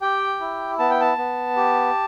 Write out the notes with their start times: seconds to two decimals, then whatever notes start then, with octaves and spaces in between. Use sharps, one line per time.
0.02 G4 G5
0.40 E4
0.79 B3 A5
0.90 G5
1.01 A5
1.18 B3
1.56 G4